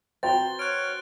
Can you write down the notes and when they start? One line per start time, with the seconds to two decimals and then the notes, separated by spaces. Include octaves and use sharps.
0.23 C4 F#4 B4 C5 G5 A#5 A6 G7
0.59 C#5 F6 F#6 D7